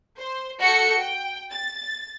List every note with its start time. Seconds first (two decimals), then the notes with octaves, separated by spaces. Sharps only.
0.18 C5
0.59 F#4 A4 G6 C#7
0.99 G5
1.51 A6